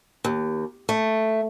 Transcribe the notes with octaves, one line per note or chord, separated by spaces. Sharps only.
D#2
A3